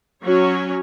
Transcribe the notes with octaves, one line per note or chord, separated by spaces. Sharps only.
F#3 C#4 F#4 C#5